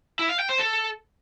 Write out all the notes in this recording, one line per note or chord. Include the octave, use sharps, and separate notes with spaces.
E4
F5
G5
C5
A4